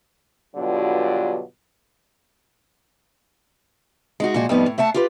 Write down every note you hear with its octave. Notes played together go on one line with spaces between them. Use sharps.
G2 B2 D3 F#3 G3 F4
G#3 D#4 F#4
A#2 F3 G#3 F#4
F2 A2 F3 G3 B3 D#4
A2
A3 E5 F#5 A5
F4 G4 B4